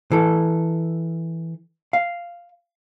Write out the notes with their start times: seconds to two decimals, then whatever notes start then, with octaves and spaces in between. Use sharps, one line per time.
0.12 E3 A4
1.93 F5